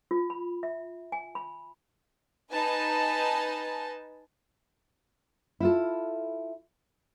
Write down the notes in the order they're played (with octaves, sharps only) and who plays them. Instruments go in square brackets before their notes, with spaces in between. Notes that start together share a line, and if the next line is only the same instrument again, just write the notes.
[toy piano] F4
B5
E5
G#5
B5
[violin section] D#4 B4 G#5 A5
[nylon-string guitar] E4 F4 A4